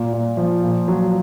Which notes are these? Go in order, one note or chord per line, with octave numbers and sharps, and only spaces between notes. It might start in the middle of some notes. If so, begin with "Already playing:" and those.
Already playing: A#2
A#2
F3
A#2
F#3